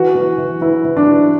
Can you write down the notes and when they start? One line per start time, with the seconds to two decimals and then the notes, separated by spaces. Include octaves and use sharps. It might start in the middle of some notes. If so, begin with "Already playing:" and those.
Already playing: E3 F#4
0.15 E3
0.38 E3
0.61 E3 E4
0.85 E3
0.97 D4
1.07 E3